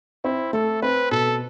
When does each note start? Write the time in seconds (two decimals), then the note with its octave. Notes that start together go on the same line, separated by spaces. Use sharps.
0.24 C4 E4
0.53 A3 A4
0.82 C4 B4
1.11 B2 A4